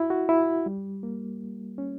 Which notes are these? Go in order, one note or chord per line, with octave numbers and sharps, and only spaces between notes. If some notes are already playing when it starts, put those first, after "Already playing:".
Already playing: E4 F#4
F#4
E4
G3
A#3
C#4